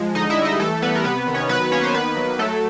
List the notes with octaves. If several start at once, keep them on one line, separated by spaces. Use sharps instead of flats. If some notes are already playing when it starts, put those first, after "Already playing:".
Already playing: F3 G#3
D3 D#4 D#5
E4 E5
G3
D#4 D#5
E3 A3 A4
G3 B3 B4
A#4
C3 B3 B4
D#3
C#4 C#5
F#3 B3 B4
A#3 C#4 C#5
C5
D#3 B3 B4
F#3
F#3 A3 A4